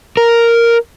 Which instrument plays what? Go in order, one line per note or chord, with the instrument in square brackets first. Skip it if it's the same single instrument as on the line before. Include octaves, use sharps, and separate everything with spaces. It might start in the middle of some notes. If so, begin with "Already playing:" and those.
[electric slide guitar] A#4